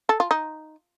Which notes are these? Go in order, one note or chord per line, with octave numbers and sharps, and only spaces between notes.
A4
F4
D#4